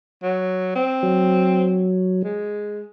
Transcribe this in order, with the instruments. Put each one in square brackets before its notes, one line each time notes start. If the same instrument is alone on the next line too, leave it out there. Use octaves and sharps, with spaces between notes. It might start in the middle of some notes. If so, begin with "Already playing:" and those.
[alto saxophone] F#3
C4
[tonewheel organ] F#3
[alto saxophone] G#3